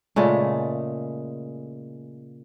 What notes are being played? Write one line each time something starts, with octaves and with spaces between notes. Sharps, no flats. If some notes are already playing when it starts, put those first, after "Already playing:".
A#2 C#3 G#3 A3